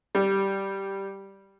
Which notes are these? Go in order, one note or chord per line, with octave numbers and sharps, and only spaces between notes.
G3